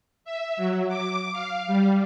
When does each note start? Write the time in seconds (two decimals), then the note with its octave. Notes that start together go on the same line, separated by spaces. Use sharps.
0.25 E5
0.57 F#3
0.88 D6
1.32 F5
1.67 G3